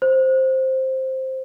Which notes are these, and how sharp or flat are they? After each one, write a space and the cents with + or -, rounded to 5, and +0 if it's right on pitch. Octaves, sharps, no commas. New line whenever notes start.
C5 +5